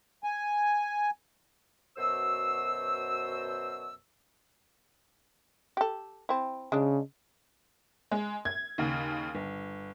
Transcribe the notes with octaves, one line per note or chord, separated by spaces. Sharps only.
G#5
F#2 B2 C5 E6
G4 A4
C4 E4
C#3 G#3 D4
G#3
G#6
D#2 C#3
G1